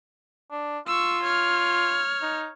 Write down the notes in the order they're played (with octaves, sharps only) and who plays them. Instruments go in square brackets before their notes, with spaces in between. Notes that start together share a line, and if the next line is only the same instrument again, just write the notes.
[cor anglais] D4
[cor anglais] F4 [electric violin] C#6 E6
[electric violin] C#5 F6
[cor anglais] D#4